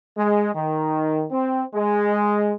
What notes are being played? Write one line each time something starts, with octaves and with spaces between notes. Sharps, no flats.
G#3
D#3
C4
G#3